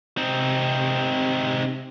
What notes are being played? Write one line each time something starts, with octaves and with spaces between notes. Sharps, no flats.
C3 C4 D#4